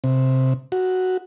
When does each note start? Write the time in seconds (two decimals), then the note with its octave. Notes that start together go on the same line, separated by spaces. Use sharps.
0.04 C3
0.72 F#4